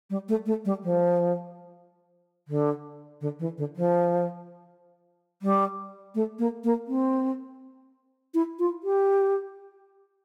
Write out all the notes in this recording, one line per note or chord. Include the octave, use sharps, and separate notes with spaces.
G3
A3
A3
G3
F3
D3
D3
E3
D3
F3
G3
A3
A#3
A#3
C4
E4
F4
G4